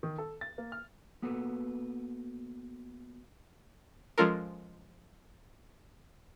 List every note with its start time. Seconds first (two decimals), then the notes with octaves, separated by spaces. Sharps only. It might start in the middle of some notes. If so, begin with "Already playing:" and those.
0.03 D#3
0.18 A4
0.41 A6
0.58 A#3
0.72 F6
1.22 A#3 B3 F#4 A4 B4
4.18 F3 G#3 C#4 F4 A4 A#4